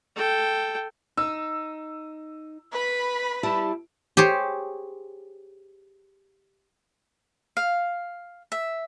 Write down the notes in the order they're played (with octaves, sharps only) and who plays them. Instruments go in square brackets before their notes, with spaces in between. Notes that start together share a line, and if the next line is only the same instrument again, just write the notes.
[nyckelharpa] A4 G5
[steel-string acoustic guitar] D#4 [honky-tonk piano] E6
[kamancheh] B4 B5
[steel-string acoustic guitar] G3 E4 A5
[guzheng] G4 G#4 C5 C#5
[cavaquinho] F5
E5